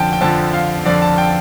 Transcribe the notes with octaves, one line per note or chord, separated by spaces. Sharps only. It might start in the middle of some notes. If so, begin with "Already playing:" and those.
Already playing: F2 D3 F3 G5 A5
G5
F2 D3 F3 A5
F5
F2 D3 F3 D5
A5
G5